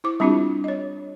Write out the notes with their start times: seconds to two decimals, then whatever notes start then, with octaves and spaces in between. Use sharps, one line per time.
0.04 E4 C5 D6
0.20 G3 C4 D4 E4 F4 G4
0.64 C#5 D#5